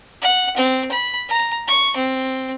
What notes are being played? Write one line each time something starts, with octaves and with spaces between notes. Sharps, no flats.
F#5
C4
B5
A#5
C#6
C4